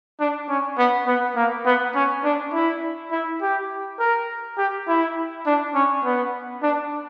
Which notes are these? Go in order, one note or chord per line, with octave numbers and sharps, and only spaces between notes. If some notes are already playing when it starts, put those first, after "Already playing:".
D4
C#4
B3
B3
A#3
B3
C#4
D4
E4
E4
G4
A#4
G4
E4
D4
C#4
B3
D4